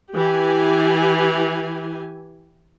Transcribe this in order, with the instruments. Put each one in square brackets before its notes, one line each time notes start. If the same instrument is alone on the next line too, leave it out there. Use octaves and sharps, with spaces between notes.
[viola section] E3 G4 G#5